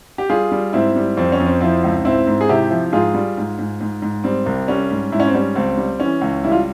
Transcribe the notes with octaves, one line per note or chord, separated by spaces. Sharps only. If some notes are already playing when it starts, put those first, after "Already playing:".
G4
G3 F4 G#4
G3
G#2 C4 E4
G3
F2 C4
C#4
F2
C4
F3 C4 E4
C#2
G#2 C4 E4
G#2
G#4
C3 E4 G4
F3
G#2 F4 G#4
G3
G#2
G#2
G#2
G#2
G3 C4
C2
G3 C#4
G#2
G#2 E4
C#4
C4
G3 C#4
C#2 C4
G3
E3 C#4
C#2
G3 E4
F4